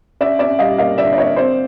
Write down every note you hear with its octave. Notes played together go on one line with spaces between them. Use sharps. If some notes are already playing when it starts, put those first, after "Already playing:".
C#4 D5 E5
C#4 D5 E5
G3 D#5 F5
A#3 D#5 F5
D3 D5 E5
D5
A#3 C#5 D#5
C4 C5 D5